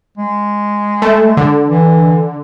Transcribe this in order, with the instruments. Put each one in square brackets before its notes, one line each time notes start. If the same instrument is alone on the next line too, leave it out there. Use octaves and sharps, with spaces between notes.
[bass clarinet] G#3
[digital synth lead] A3
D3
[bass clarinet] E3